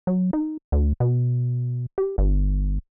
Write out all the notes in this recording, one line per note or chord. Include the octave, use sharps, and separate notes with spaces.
F#3
D#4
D2
B2
G4
G1